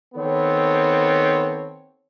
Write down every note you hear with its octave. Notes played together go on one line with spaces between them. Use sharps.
D#3 B3 C4 A4 C#5